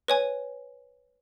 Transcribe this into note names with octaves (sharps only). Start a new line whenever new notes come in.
B4 C#5 G#5